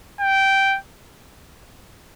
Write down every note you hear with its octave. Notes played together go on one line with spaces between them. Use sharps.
G5